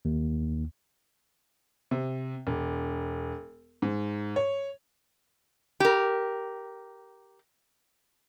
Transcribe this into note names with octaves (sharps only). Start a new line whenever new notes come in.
D#2
C3
E1
G#2
C#5
G4 A#4